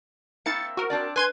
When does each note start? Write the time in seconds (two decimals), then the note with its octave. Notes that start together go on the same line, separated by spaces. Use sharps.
0.46 A#3 C4 E4 A6 C#7
0.77 F#4 A#4
0.90 C4 D4 D5
1.16 B4 G#5 C6 G#6